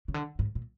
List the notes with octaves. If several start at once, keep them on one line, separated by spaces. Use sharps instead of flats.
C#3
D3
G#2
A#2